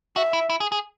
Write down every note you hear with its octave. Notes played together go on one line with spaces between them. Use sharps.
F#4 E5
E4
E4
G#4
G#4